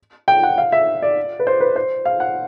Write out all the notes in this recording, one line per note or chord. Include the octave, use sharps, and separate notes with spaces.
G5
F#5
F5
E5
D5
B4
C5
B4
C5
F5
F#5